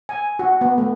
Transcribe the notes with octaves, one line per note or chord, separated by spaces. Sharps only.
G#5
F#4
B3
A3